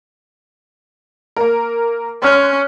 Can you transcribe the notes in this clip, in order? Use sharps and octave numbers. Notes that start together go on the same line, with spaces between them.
A#3 A#4
C#4 C6 F6 F#6